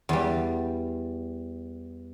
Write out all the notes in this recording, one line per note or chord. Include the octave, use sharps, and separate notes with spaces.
E2 G3